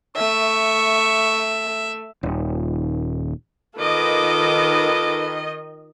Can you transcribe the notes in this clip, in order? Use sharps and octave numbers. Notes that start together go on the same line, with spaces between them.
A3 E5 C#6
D#1
D#3 F4 A4 B4 D#5 D6